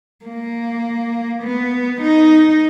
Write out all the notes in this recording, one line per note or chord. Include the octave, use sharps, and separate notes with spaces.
A#3
B3
D#4